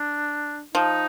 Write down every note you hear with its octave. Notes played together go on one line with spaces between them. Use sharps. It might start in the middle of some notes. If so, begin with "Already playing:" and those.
Already playing: D4
F3 D#4